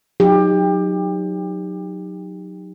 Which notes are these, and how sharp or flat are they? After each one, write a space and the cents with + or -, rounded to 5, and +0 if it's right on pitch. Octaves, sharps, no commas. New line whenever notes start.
F#3 -15 D#4 +0 G4 +25